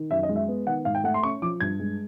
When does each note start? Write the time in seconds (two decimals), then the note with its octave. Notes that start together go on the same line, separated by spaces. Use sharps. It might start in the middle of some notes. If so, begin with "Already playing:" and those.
Already playing: D#3
0.11 F#2 E5
0.23 D#5
0.29 G#3
0.36 E5
0.48 B3
0.67 D#3 F#5
0.85 G#2 F5
0.95 G5
1.04 A3 F#5
1.14 C6
1.23 C#4 C#6
1.42 F3 D6
1.60 G2 G#6
1.80 G#3